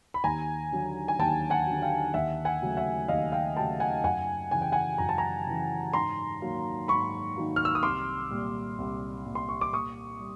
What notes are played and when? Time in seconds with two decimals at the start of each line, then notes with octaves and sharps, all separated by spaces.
0.14 B5
0.24 D#2 G#5 A#5
0.72 D3 F#3
1.08 G#5
1.19 D#2 G5 A5
1.50 F#5 G#5
1.67 D3 F#3
1.82 F5 G5
2.14 D#2 E5 F#5
2.45 F#5 G#5
2.62 C#3 F#3 A3
2.77 E5 F#5
3.08 D#2 D#5 F5
3.32 F5 G5
3.56 C#3 F#3 A3 G5 A5
3.80 F#5 G#5
4.03 F#2 F#5 G#5
4.51 C#3 E3 G#5
4.62 G5
4.72 F#5 G#5
4.98 F#2 A#5
5.09 A5
5.18 G#5 A#5
5.47 C#3 E3
5.93 G#2 A#5 C6
6.41 D#3 F#3 A#3
6.88 G#2 B5 C#6
7.36 D#3 F#3 A#3
7.56 F6
7.65 E6
7.75 D#6
7.83 C2 C6 D6
8.31 A#2 G3
8.78 C2
9.26 A#2 G3
9.35 C6
9.49 C#6
9.61 D6
9.73 A#2 C#6 D#6
10.20 G3